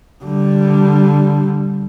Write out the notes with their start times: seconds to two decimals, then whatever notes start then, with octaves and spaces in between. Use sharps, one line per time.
0.24 D3 G3